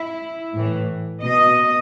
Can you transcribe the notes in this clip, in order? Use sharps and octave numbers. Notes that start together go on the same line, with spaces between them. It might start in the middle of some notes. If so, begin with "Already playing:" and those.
Already playing: E4
A2 E3
B2 D#5